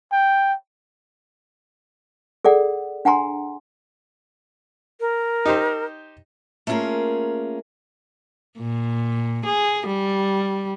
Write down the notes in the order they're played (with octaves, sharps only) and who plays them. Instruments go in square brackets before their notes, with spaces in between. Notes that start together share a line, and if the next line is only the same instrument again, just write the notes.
[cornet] G5
[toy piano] G#4 A4 D5 F#5
D4 F#5 G#5 A#5 C6
[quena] A#4
[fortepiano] D#4 G4 C5
[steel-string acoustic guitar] A3 A#3 C#4 F4 G#4 A#4
[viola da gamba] A#2
G#4
G3